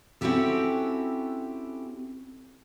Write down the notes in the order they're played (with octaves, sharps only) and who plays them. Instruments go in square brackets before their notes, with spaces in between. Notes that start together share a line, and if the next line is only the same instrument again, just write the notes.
[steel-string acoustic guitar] C4 C#4 E4 F#4 G4 A4